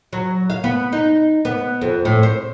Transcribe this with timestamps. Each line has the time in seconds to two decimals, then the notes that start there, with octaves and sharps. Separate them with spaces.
0.13 F#3
0.50 F5
0.64 B3
0.93 D#4
1.45 B3
1.82 F2
2.05 A2
2.23 C5